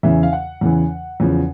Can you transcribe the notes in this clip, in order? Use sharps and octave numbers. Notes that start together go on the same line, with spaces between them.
E2 C#3 E3 E5
F5
F#5
E2 C#3 E3
E2 C#3 F3